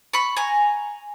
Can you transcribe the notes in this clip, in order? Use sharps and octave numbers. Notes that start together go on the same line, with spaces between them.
B5 C#6
G#5 A#5